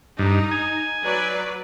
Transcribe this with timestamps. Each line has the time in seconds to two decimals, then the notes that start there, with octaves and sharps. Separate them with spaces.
0.19 G2 D#4
0.51 G#5
1.02 F#3 B4 D5